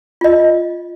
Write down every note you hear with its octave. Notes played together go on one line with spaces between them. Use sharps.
F4 D#5